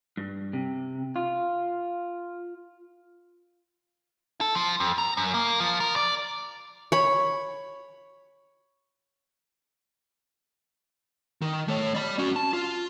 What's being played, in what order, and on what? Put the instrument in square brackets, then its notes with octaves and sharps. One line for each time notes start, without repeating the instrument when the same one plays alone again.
[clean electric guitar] G2
C3
F4
[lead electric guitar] A4
F3
F2
A#5
F#2
A#3
F3
A#4
D5
[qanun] C#5 B5
[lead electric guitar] D#3
A3 C#5
D5 B5
C#4 F#4
A5
F4